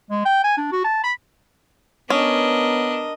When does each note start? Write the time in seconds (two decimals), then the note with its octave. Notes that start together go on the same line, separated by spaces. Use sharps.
0.10 G#3
0.25 G5
0.44 G#5
0.57 D4
0.72 F#4
0.84 A5
1.04 B5
2.10 B3 C#4 D4 A#4 D#5